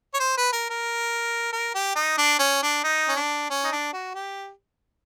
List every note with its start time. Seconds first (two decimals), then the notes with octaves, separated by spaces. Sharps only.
0.14 C#5
0.20 C5
0.37 B4
0.53 A#4
0.70 A#4
1.52 A#4
1.74 G4
1.95 D#4
2.18 D4
2.39 C#4
2.62 D4
2.84 D#4
3.08 C#4
3.16 D4
3.50 C#4
3.64 D#4
3.72 D4
3.93 F#4
4.15 G4